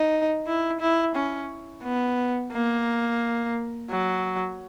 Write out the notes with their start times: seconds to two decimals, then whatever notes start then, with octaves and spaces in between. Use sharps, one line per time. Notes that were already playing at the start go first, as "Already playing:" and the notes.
Already playing: D#4
0.46 E4
0.80 E4
1.15 C#4
1.83 B3
2.53 A#3
3.90 F#3